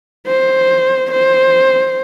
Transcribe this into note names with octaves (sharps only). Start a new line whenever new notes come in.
C5
C5